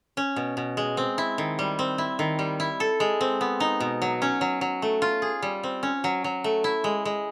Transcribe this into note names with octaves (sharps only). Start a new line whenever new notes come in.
C#4
B2
B2
G#3
C4
E4
D#3
G3
C4
E4
D#3
G3
E4
A4
G#3
C4
B3
D#4
B2
F#3
C#4
F#3
F#3
A3
F4
G#4
G3
C4
C#4
F#3
F#3
A3
E4
G#3
G#3